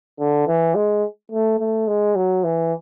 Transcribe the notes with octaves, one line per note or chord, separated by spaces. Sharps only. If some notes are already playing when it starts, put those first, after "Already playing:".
D3
E3
G#3
A3
A3
G#3
F#3
E3